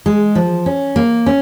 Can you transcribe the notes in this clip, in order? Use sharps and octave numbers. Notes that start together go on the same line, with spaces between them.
G#3
F3
C#4
A#3
C#4